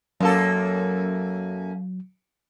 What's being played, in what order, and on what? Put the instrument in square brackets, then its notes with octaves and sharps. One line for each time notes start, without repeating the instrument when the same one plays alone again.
[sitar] F#2 A#3 A4 [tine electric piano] F#3